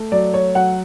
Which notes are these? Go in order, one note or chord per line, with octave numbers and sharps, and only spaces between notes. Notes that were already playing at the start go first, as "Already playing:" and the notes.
Already playing: A3
F#3 D5
C#5
F#3 F#5